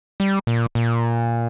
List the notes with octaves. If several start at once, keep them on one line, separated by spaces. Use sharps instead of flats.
G3
A#2
A#2